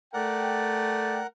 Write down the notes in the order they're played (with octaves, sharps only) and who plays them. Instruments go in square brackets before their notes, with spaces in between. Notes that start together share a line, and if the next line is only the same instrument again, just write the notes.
[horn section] A3 D5 G5 [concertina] A#4 F#5